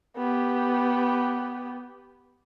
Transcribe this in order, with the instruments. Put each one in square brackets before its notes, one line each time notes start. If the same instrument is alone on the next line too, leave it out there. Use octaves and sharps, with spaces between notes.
[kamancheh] B3 G4